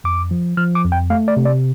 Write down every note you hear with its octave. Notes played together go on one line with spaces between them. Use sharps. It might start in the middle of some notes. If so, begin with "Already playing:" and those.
F2 D6
F3
F3 F6
D6
F2
G5
A3 F5
D5
C3
D5